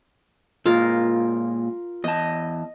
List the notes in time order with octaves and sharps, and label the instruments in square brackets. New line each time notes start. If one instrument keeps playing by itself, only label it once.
[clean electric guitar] A#2 G#3 [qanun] F4 A#4
[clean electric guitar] E2 A5 [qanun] D#5